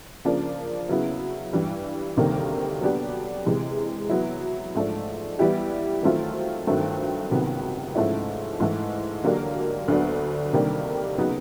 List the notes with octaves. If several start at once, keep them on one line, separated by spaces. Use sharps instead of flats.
C#3 F3 A#3 D4
C#3 F#3 B3 E4
G2 E3 G3
D2 C3 D#3 G3 A#3
F#3 B3 D4 G4
C3 E3 G#3
F#3 B3 E4
G#2 F3 A3 D4
E3 G3 B3 E4 G4
D#3 F#3 A3 C4 F4
G2 D#3 F#3 A3 C4
C#2 C3 D#3 F#3 B3
G#2 F3 A3 C#4 E4
G#2 E3 A3
D3 F#3 A#3 D4 G4
D2 D3 F#3 B3 D4
C3 D#3 G3 A#3 D4
C#3 F#3 B3 D#4